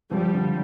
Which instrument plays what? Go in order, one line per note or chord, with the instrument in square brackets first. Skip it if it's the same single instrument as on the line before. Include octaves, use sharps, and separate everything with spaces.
[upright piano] F3 [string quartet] G3
[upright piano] D3